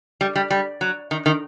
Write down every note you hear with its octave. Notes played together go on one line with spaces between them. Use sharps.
G3
G3
G3
F#3
D#3
D#3